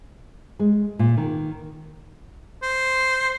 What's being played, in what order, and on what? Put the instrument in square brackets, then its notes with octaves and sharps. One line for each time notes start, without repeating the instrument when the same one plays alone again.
[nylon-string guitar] G#3
A#2
D#3
[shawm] C5